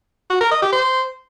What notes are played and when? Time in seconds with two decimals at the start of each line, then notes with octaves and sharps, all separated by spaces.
0.30 F#4
0.41 A#4
0.51 D#5
0.62 G4
0.72 C5